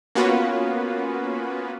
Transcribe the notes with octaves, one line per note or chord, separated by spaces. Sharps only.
A#3 B3 C#4 F4 F#4 B4